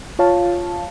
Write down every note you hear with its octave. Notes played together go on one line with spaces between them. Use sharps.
F4 C#5 F5 A5